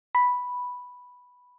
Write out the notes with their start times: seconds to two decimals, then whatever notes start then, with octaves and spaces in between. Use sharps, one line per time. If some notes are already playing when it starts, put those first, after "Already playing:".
0.15 B5